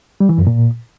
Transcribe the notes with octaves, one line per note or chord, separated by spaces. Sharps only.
G3
E3
F#2
A#2